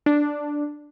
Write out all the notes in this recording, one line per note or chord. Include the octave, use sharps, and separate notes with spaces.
D4